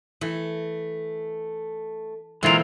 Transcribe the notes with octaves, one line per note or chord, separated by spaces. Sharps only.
E3 A3
A#2 D3 E3 G#3 C4 F4 A#4